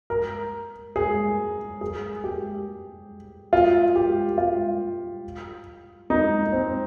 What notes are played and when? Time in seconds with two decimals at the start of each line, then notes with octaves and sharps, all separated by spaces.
0.10 A#4
0.96 G#4
1.81 G#4
2.24 G4
3.53 F4
3.96 G4
4.38 F4
6.10 D#4
6.52 C4